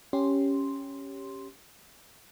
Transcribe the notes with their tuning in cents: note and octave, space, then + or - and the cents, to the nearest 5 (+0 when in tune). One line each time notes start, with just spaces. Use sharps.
C#4 +0 G4 +0 C6 +0